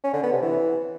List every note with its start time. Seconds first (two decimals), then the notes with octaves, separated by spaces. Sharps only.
0.04 C#4
0.13 D3
0.23 B3
0.33 C3
0.42 E3